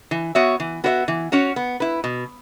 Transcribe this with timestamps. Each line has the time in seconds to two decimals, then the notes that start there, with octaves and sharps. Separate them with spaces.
0.11 E3
0.35 B3 F#4 C#5 E5
0.60 E3
0.84 B3 F#4 C#5 E5
1.08 E3
1.32 C#4 F#4 C#5
1.56 B3
1.80 E4 B4
2.04 B2